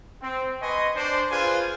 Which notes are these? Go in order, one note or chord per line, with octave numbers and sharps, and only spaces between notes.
C4
B4 D#5 G#5 C6 C#6
D4 C5
F4 G#4 B4 C5 G#5